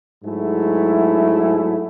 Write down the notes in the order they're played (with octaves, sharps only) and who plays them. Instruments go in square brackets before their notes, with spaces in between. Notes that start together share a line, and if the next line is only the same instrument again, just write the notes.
[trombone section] G#2 F#3 A3 E4 G#4